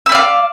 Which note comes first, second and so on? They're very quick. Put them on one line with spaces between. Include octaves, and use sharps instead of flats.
E6 B5 D5 F5